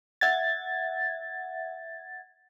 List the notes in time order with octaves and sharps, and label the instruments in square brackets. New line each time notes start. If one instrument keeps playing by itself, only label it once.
[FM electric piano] E5 F#5 G#6 A6